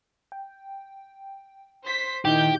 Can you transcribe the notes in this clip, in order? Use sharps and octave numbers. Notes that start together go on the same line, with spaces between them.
G5
C5 B6
A#2 D#3 D#4 E4 G4 G6